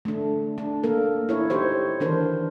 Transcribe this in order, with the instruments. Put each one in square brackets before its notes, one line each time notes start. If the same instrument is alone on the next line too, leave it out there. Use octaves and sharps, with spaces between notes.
[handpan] A3 D4
D4
A#3 A4 A#4
E4 C#5
D#4 G4 C5 C#5
D#3 E3 D4 A#4 C5